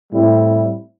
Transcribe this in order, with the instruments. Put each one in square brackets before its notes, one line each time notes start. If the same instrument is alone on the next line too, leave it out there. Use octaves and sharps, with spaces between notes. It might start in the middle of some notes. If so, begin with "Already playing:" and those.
[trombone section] A2 G3 C4 E4